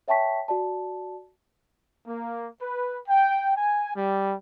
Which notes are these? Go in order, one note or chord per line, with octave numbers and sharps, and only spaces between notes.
C#5 E5 G5 A5 C#6 B6
F#4 D5 A5
A#3
B4
G5
G#5
G3